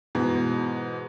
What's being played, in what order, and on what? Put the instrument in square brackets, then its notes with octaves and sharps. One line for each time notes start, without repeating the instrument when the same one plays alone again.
[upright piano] G#2 B2 E3